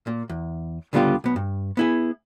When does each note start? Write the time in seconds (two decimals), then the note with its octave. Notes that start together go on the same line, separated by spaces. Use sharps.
0.07 A#2
0.29 E2
0.93 C#2 D3 G3 B3 F4 G4
1.24 B1 B3
1.36 G2
1.77 B3 E4 G#4